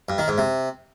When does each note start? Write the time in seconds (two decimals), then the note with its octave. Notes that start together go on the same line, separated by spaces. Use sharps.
0.09 G2
0.18 D#3
0.28 G#2
0.38 C3